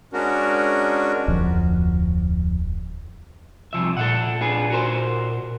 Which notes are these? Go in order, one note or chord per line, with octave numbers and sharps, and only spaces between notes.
G#3 C#4 D4 F#4 A#4
D1 F2
C2 F3 E5
A#2 A4 E5 F#5
D4 G#4 B4
F#4 A#4 C5